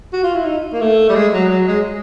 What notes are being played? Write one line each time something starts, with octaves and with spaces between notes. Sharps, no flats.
F#4
F4
E4
D#4
A#3
A3
G3
G#3
F#3
F#3
G#3